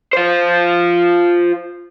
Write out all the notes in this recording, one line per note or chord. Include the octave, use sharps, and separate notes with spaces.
F4 C5